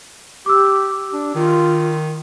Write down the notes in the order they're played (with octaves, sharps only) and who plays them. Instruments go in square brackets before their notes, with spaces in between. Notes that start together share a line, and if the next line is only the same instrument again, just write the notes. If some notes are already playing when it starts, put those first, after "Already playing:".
[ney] G4 [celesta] D6 E6
[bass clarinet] D4
[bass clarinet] D#3 [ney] F4